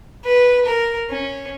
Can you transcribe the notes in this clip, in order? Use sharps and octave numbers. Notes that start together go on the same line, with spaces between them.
B4
A#4
C#4